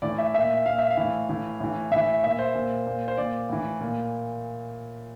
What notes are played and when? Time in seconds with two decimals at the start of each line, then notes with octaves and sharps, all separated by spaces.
0.02 A2 E3 D5
0.18 E5
0.34 A#2 E5
0.66 A#2 F5
0.78 E5
0.90 F5
0.97 A2 E3
1.29 A2 E3
1.60 A2 E3
1.91 A2 E3 E5
2.23 A#2 E5
2.39 C5
2.55 A#2
2.86 A#2
3.08 C5
3.17 A#2 D5
3.49 A2 E3
3.80 A#2